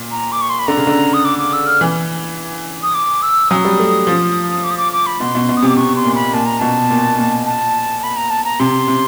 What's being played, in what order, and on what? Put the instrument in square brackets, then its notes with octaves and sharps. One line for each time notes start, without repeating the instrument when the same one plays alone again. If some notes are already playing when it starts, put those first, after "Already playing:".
Already playing: [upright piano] A#2
[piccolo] A#5
D6
C#6
C6
B5
[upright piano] D3 [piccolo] A#5
[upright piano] C#3
D3
[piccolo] D#6
D6
D6
E6
F6
[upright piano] E3
[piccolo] D#6
D6
E6
[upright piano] F#3 [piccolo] D#6
[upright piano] G3
A3
F3
[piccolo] D6
D#6
D6
D6
B5
[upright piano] B2 [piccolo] C6
[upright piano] B2
B2
[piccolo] D#6
[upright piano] C3 [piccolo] D6
[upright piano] C3 [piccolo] C#6
[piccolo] C6
[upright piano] A#2
[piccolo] B5
[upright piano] A#2 [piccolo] A5
[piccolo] A#5
[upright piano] B2 [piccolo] A5
[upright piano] A#2
A#2
[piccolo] A5
B5
A#5
A5
A#5
[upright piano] C3 [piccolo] C6
[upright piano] C3